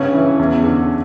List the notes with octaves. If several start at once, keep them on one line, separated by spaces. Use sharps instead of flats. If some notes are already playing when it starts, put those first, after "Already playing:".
Already playing: G2 C#3 C#4
E3
E2
D3